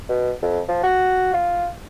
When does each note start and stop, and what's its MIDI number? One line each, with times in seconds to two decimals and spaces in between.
0.09 0.32 47
0.43 0.60 41
0.69 0.81 53
0.83 1.31 66
1.33 1.68 65